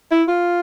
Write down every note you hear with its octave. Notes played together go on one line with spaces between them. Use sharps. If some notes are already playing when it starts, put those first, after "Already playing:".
E4
F4